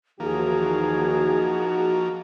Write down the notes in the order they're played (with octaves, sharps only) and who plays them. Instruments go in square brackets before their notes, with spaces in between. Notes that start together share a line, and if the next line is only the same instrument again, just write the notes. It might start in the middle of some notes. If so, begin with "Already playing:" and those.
[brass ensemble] D#2 E3 [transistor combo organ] F3 A#3 [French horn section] D#4 F#4 [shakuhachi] G#4